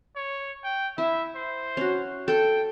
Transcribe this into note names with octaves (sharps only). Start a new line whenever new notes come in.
C#5
G5
E4 E5
C5
C#4 F#4
A4 G5